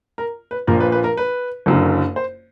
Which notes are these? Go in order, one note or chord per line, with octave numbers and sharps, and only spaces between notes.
A#4
B4
A#1 A#2 F3 A#4
B4
B4
A#4
B4
F#1 F#2 D3
C5